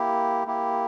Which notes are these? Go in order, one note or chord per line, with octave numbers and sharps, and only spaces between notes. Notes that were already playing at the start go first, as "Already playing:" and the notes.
Already playing: A#3 E4 G4
A#3 E4 G4